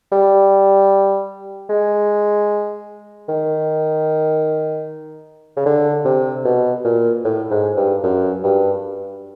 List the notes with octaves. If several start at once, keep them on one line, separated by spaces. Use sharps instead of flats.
G3
G#3
D#3
C#3
D3
C3
B2
A#2
A2
G#2
G2
F#2
G2